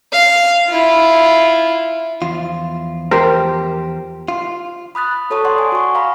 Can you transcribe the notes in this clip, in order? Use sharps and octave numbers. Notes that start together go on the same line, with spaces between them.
F5
E4 F4
E2 F3 F4
G4 A#4 C5
F4
B5 D#6 F#6 A6
F#4 A4 C#5 A5 C#6 D#6
D5 F#5 C6 D#6
G#5
F#4 C#6
F5 A#5 B5